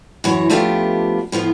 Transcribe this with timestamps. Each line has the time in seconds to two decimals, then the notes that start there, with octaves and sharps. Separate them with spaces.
0.24 F#2 E3 F#4 C#5
0.50 F3 A3 B3 D4 F4 G4
1.32 A2 F3 B3 F4